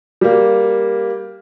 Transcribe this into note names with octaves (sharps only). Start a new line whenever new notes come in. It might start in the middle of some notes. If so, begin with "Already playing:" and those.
G3 A#3